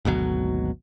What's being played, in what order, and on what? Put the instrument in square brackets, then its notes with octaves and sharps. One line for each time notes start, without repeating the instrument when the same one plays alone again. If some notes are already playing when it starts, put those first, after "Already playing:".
[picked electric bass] G#1 D2 B2 F#3